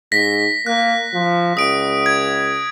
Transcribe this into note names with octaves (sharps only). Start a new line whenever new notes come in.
G#2 A#6 B6
A#3 F#6
F3
C#2 D#6 D7
G#6